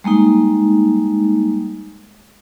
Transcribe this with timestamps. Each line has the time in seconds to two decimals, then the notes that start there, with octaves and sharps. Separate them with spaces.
0.04 G3 G#3 A#3 D#4